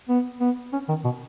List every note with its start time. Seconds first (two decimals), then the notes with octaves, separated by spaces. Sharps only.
0.09 B3
0.40 B3
0.73 C#4
0.88 D#3
1.04 B2